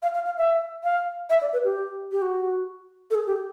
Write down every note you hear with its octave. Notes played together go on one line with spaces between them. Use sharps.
F5
F5
F5
E5
F5
E5
D5
B4
G4
G4
F#4
A4
G#4
G4